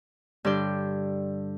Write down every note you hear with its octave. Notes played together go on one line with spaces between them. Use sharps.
G2 D3 D5 G6